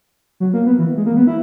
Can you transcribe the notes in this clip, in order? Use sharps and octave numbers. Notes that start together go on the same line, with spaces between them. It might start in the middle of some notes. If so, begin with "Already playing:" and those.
F#3
A#3
B3
E3
G#3
A#3
B3
E4